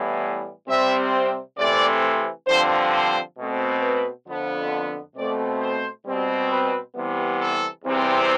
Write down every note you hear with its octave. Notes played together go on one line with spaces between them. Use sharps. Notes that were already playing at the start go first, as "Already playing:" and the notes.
Already playing: A2 E3 G3 B3
C3 G3 C4 E5
C3 E3 A3 C4 D5
G2 D3 F3 C4 C5
C5
B2 A3 C4
B4
F2 D3 F3 B3
B2 A3 C4 D5
C5
B2 G3 C4
B4
C3 E3 G3 B3
A4
E2 C3 E3 G3 C4